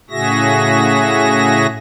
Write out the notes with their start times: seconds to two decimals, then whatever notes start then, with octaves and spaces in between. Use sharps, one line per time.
0.10 A2 C#3 F#4 G#4 E5 A#6